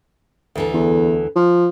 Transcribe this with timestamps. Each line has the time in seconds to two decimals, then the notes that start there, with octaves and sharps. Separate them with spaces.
0.55 D2 E3 A4
0.74 E2
1.36 F3